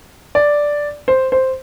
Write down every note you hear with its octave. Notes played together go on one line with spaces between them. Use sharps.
D5
C5
C5